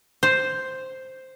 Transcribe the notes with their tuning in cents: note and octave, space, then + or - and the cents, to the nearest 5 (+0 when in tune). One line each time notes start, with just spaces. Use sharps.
C5 +0